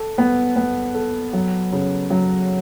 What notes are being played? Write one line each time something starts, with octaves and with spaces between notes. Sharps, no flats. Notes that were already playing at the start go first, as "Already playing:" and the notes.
Already playing: A4
B3
B3
A4
F#3
C#3
F#3